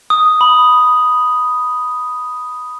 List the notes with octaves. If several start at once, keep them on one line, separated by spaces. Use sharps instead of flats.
D#6
B5